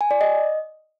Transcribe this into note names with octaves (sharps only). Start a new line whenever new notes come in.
G#5
D5
D#5